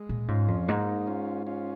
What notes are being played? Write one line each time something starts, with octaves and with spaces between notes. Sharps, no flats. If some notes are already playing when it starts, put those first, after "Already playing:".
Already playing: G#3
A#2
G#2 C#4 F4
F2
G#2 A#3 D#4
C#4 F4
C#4 F4